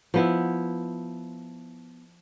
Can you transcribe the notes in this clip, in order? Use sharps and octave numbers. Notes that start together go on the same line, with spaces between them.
F3 B3 E4